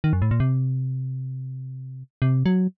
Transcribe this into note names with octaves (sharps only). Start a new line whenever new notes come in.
D#3
F#2
A2
A#2
C3
C3
F#3